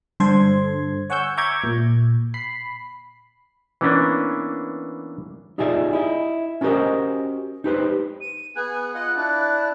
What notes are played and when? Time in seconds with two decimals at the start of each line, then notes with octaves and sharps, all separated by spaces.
0.20 G2 D3 A4 C5 C6 G#6
1.10 C#5 F#5 G#5 C#6 E6 G6
1.37 E5 A#5 C#6 D6 G6 G#6
1.64 A#2
2.34 B5 C7
3.81 E3 A#3 B3 C#4 D4
5.58 D#4 F4 G4 G#4 D5 E5
5.93 E4 D#5
6.61 C#4 F#4 G4 A#4 C5 D#5
7.64 D#4 G4 B4 C5
8.21 D#7
8.56 B3 G#4 G#5 F#6
8.95 F4 D#5 F#5
9.16 D4 E4 D5